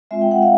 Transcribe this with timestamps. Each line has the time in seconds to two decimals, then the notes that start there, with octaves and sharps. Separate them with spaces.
0.11 G#3 C4 F4 E5
0.21 G5
0.31 F#5
0.42 F5